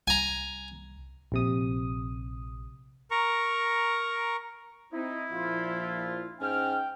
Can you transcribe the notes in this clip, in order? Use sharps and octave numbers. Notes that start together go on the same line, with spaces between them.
C2 G#5 A#5
A#1 C3 D#6
A#4 A#5 C#6
C4 D#4 E4
A#1 F3 F4
G#2 C#4 G5 F6